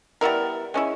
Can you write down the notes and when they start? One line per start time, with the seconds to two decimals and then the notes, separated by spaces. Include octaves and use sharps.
0.21 G3 B3 E4 A#4
0.74 G#3 C#4 E4